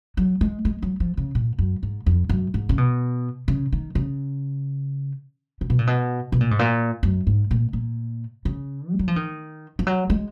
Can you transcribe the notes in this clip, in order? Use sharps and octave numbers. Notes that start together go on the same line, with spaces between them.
F#3
G#3
G#3
F#3
F3
C#3
A#2
F#2
G#2
F2
F#2
G#2
C#3
B2
C#3
D#3
C#3
C#3
B2
A#2
B2
B2
A#2
G#2
A#2
F#2
G#2
A#2
A#2
C#3
G#3
F#3
F3
D#3
F3
F#3
G#3